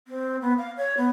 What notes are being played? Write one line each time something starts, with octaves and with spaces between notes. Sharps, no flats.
C4
B3
F5
C#5
B3